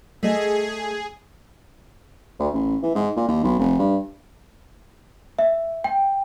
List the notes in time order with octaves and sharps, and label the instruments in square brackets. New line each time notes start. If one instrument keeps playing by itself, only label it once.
[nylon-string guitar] A3 D#5 [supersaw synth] G#4
[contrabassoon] D2
A1
E3
G#2
A#2
D#2
B1
F1
G2
[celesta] E5
G5